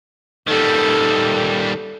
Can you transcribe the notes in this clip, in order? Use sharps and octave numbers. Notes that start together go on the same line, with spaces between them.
D#3 G3 A4